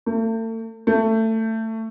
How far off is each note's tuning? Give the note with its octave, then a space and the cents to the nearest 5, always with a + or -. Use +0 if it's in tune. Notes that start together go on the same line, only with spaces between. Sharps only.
A3 +40
A3 +20